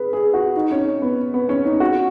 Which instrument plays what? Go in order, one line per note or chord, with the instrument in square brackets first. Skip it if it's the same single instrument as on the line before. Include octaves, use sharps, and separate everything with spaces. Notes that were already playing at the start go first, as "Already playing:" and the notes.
Already playing: [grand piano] G#4 B4
G#4
F#4
D#4
C#4
B3
B3
C#4
D#4
F#4